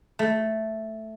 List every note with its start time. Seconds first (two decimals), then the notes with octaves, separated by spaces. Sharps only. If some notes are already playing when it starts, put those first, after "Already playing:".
0.19 A3